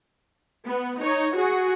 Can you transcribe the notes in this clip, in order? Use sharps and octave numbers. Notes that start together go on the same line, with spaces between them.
B3
D#4 C#5
F#4 G#4